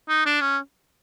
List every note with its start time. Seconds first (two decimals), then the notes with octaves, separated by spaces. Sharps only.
0.09 D#4
0.26 D4
0.41 C#4